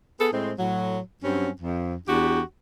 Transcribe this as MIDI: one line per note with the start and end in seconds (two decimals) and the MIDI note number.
0.20 0.27 59
0.20 0.27 68
0.20 0.27 69
0.20 0.27 71
0.32 0.52 45
0.32 0.52 56
0.32 0.52 60
0.58 0.99 45
0.58 0.99 54
1.23 1.50 43
1.23 1.50 54
1.23 1.50 60
1.23 1.50 61
1.61 1.94 41
2.07 2.41 40
2.07 2.41 62
2.07 2.41 66
2.07 2.41 67